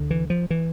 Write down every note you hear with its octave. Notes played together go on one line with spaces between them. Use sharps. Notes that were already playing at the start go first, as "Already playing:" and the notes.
Already playing: D2 D3
E3
F3
E3